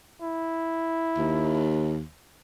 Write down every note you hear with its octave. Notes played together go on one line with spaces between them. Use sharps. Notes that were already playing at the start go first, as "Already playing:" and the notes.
E4
D#2